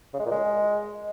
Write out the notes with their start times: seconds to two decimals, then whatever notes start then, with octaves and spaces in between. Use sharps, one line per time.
0.14 C#3
0.19 G#3
0.25 A#2
0.31 G#3